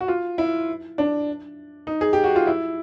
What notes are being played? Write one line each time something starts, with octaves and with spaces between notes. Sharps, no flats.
F#4
F4
E4
D4
D#4
G#4
G4
F#4
F4
E4